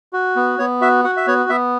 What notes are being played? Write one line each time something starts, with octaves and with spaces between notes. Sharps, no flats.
F#4
B3
B3 C#5
F#4 E5
F#4 F#5
E5
B3 C#5
B3 E5